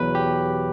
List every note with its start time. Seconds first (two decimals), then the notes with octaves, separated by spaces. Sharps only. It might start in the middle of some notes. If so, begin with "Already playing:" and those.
Already playing: E2 B2 F#3 B4
0.15 G4